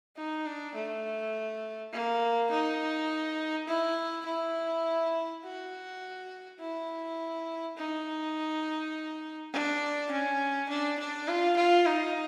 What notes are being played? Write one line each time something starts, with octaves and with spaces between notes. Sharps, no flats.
D#4
D4
A3
A#3
D#4
E4
E4
F#4
E4
D#4
D4
C#4
D4
D4
F4
F4
D#4